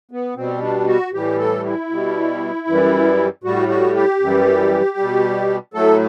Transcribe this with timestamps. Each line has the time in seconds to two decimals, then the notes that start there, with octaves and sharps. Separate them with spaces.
0.11 B3
0.36 B2 G3 C4
0.63 D4
0.88 F#4
1.13 A2 E3 G3 G4
1.39 A4
1.65 E4
1.90 B2 G3
2.68 F#2 E3 G3
3.44 A2 G3 F#4
3.69 F#4
3.95 G4
4.20 F#2 E3 G3
4.97 B2 G3
5.74 A2 F#3 A3 A4